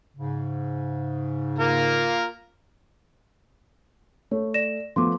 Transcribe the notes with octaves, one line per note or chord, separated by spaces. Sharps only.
G#2 C#3
A#3 F4 A#4
A3 C#5
D5 A#6 E7
F3 A3 B3 C6 D6